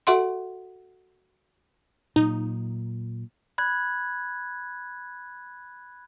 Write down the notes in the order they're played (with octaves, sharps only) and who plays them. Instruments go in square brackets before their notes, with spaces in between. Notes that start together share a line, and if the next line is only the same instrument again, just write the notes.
[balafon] F#4 A4 E5 F#5 C6
[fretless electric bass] A#2 F#3 A#3 [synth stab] D#4
[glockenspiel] B5 F#6 G#6